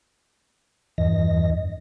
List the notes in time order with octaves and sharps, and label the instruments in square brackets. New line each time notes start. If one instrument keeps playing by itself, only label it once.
[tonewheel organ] E2 G2 E3 D#5 A#6